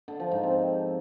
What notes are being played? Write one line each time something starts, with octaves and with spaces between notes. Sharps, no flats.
D3
F3
G#2
C4